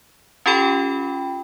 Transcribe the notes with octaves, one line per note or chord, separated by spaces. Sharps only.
C#4 F4 G4 A4 G5 B5